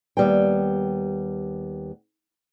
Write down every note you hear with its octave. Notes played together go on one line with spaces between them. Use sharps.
D#2 G3 B3 G5